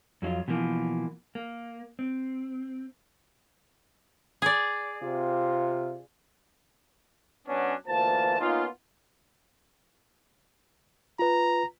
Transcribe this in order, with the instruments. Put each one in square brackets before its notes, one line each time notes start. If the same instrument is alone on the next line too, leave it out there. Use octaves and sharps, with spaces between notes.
[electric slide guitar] F2 F#3 D4 F4
B2 E3 F3 A#3
A#3
C4
[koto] G#4 D5
[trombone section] C3 F4
[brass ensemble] F#3 B3 C#4 D4
D2 E3 A#3 F4 C5 A5
A#3 B3 C#4 D#4 F4
[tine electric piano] F4 B4 [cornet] A#5